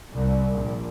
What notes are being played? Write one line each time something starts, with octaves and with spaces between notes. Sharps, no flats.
C2
A#1